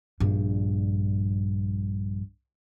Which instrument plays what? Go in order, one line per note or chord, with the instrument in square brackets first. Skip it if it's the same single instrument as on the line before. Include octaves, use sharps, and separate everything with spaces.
[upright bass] A#1 G2